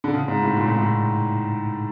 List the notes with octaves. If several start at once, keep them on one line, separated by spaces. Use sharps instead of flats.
D3
C#3
G#2
A2
A#2
A2
G#2
A2